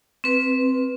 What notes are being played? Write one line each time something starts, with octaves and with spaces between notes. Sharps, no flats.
C4 B4